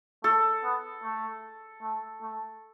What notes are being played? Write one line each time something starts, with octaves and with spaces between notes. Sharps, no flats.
A3 A4
B3
A3
A3
A3